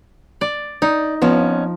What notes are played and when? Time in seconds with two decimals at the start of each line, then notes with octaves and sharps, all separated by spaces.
0.41 D5
0.82 D#4 D5
1.22 F2 F3 B3 C#4